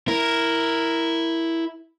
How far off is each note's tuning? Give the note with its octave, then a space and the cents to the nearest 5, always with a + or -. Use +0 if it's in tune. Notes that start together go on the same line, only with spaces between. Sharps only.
E4 +0 A#4 +0